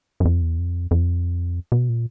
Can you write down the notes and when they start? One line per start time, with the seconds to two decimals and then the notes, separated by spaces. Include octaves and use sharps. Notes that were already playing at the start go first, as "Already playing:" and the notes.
0.20 F#2
0.25 F2
0.42 E2
0.58 F2
0.91 F2
1.72 B2
1.89 A#2